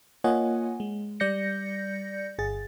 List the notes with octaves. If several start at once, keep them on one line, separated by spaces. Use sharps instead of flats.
A#3 F4 C#5 D#5 F#5 G#5
G#3
G3 D5 G6 A#6 C#7
G1 G#4 A6